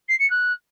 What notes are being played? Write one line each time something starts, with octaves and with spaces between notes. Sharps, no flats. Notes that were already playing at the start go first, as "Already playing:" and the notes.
C7
C#7
F#6